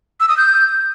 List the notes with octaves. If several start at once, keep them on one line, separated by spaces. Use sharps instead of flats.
E6
D#6
G6